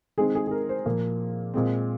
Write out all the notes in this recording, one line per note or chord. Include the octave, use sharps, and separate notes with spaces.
D#3 G#3 C4 G#4
G#4
G#4
A#4
C5
A#2 F3 A#3
A#2 G#3 C4